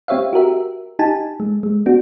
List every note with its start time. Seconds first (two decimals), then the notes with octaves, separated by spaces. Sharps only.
0.08 C4 G4 C#5 E5 F5
0.33 F#4 G4 A#4 E5
0.99 D#4 G4 G#5 A5
1.40 G#3
1.63 G#3
1.86 B3 D4 F#4